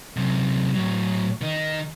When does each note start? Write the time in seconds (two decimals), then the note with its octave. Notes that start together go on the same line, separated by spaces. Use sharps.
0.16 F#2 C3
0.75 A2 F#3
1.41 D#3 D#4